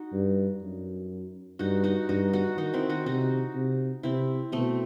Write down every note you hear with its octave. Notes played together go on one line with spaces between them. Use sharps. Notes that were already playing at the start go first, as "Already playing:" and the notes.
Already playing: D#4 F#4
G2
F#2
G2 D#4 F#4
D#4 F#4
G2 D#4 F#4
D#4 F#4
D#3 D#4 F#4
C4 E4
D#4 F#4
C3 D#4 F#4
C3
C3 C4 E4
B2 A3 C4